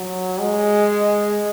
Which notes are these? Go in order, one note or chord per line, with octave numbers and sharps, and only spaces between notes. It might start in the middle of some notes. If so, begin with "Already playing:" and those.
Already playing: F#3
G#3